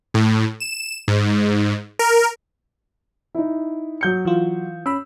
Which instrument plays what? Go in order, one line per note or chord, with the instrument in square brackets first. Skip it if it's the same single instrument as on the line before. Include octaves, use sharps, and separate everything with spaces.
[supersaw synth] A2
E7
G#2
A#4
[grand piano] D#4 E4
F#3 G6 C#7
[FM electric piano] E3 F4
[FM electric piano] C#4 B5 [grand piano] E6